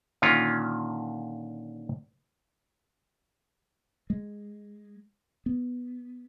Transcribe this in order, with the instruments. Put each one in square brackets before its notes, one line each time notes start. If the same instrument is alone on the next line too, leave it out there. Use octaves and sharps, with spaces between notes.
[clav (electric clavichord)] A#2 D3 D#3 C#4 F4
[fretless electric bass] G#3
B3